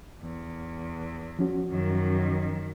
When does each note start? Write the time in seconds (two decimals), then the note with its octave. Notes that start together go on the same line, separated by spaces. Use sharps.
0.22 E2
1.39 F3 C#4 F#4
1.71 F#2 D#3